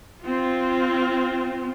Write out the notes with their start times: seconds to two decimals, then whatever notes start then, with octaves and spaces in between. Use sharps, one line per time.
0.22 C4 F4